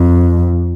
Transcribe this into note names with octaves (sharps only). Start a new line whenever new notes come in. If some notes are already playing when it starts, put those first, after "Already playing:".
Already playing: F2